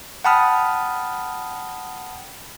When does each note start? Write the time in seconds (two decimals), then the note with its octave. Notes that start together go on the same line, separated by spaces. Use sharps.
0.25 F#5 G5 A5 B5 D#6 F6